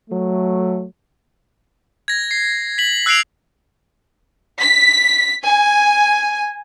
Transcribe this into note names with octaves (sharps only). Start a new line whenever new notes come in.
F#3 A3
G#6 A#6
C7
B6 F#7
E6 F#6 B6 C7 D7 F7
B6
G#5